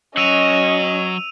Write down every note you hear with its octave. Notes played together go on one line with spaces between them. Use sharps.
F#3 C#4 F#4 D#5 E6 D#7 F7